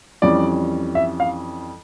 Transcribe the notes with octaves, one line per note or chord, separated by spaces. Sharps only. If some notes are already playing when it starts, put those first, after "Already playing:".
F2 E3 G3 C#4 D5
E5
F5